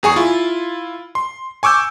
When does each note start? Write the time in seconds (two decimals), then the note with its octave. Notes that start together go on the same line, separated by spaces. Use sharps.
0.03 E2 G#4 G#5 C#6
0.16 E4 F4
1.15 C6
1.63 G#5 C#6 D6 E6 G6